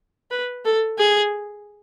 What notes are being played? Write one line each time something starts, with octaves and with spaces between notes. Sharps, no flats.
B4
A4
G#4